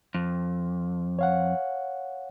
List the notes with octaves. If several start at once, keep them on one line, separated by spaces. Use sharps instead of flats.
F2
C#5 F5 F#5